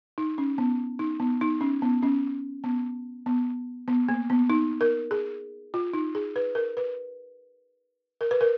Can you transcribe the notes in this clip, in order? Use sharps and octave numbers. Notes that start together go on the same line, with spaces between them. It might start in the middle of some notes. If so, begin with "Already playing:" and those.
D#4
C#4
B3
D#4
B3
D#4
C#4
B3
C#4
B3
B3
B3
A#3
B3
D#4
A#4
G#4
F4
D#4
G#4
B4
A#4
B4
A#4
B4
A#4